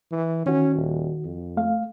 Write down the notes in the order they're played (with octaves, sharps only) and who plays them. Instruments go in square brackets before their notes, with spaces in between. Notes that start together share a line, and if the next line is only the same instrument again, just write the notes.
[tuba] E3
[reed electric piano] D#3 F#4 [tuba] C#4
[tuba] D#1
F2
[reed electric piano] A3 F5